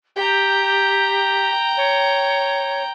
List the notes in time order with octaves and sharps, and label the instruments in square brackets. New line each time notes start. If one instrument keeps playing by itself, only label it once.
[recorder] G4 [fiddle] G5 A#5
[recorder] C#5